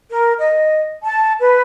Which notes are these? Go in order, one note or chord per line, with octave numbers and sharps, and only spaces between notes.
A#4
D#5
A5
B4